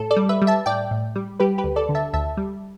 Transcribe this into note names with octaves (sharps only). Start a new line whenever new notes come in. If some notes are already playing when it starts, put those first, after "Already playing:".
Already playing: A2 A4
A4 D5
G3
B4 E5
G3
E5 A5
A2 D5 G5
A2
G3
G3 G4 B4
G4 B4
D2
A4 D5
D3
E5 A5
D2 E5 A5
G3